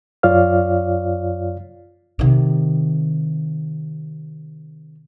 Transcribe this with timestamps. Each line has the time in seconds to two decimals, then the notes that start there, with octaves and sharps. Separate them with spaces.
0.23 F#2 F4 C#5 D5 F5 F6
2.19 C3 D#3